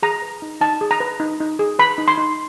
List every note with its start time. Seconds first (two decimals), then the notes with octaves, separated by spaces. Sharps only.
0.03 G#4 A#5
0.22 B4
0.42 D#4
0.61 D#4 A5
0.81 G#4
0.91 A#5
1.00 B4
1.20 D#4
1.40 D#4
1.59 G#4
1.79 B4 B5
1.98 D#4
2.08 C6
2.17 D#4